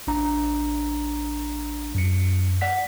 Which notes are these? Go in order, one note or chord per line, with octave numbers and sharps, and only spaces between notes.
A1 D4 A#5
F#2 C#7
D5 F#5 B6